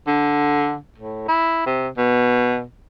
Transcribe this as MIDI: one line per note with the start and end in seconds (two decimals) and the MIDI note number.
0.07 0.76 50
0.98 1.27 45
1.28 1.61 64
1.66 1.88 48
1.97 2.62 47